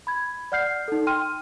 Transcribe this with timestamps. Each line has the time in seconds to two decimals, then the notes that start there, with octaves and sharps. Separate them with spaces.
0.07 B5 G#6
0.52 D5 F#5 F6 G6 C7
0.88 D#4 A4
1.07 G5 C6 F6 D#7